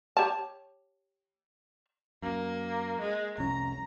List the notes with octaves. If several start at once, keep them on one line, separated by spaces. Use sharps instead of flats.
G4 C#5 A5
F#2 A#3
G#3
F1 C2 C#4 A#5